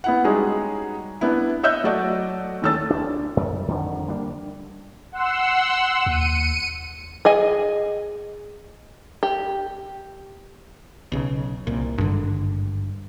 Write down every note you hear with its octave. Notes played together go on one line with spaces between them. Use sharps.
B3 E4 F#5
G3 G#3 C#4 D#4 F#4 G#4
B3 D4 E4
C#5 D#5 E5 E6 F#6 G6
F#3 A3 F#4 D5 D#5
E2 D#3 A3 C#4 E6 A6
D2 D4
F#2
F2 D3 D#3
G3 A#3 D4
F#5 C6 E6
D#2 C#7 D#7
G#4 D#5 G#5
G4
B1 C#3
C2 A#2
G#1 G2 D3